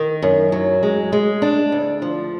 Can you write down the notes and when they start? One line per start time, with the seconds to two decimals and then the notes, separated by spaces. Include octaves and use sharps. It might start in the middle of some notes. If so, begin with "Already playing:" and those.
Already playing: D#3
0.22 F#2
0.52 F#3
0.83 G#3
1.12 G#3
1.42 D4
1.72 D2
2.02 F3